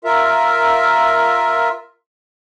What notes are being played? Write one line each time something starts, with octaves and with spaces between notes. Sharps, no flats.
F4 A#4 E5